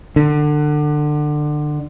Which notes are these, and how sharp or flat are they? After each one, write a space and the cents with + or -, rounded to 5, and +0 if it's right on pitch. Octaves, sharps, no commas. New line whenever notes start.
D3 +25